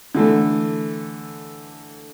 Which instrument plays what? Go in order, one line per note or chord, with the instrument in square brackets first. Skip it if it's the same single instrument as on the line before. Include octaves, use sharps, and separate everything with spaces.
[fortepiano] D3 E3 A3